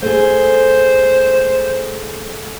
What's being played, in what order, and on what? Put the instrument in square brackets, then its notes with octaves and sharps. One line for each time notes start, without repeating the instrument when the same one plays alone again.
[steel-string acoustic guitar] A3 G#4 [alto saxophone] C5